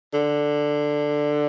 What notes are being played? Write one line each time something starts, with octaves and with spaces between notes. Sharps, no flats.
D3